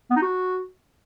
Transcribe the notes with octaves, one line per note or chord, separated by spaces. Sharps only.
B3
D#4
F#4